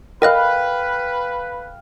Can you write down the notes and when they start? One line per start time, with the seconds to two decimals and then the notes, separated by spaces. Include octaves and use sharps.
0.22 A#4 B4 D#5 F5 G5 F#6